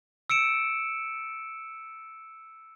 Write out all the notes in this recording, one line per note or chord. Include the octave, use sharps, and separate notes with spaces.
E6 C#7 D7 E7